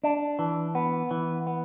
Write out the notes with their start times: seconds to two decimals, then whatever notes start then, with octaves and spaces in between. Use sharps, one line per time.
0.03 D4
0.39 E3
0.75 B3
1.11 E3
1.47 B3